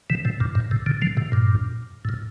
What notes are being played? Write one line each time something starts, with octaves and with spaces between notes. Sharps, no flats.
C3 E3
A2 C3
G2 A#2
G2 A#2
A2 C3
A#2 D3
D3 F3
A2 C3
G2 A#2
A2
A#2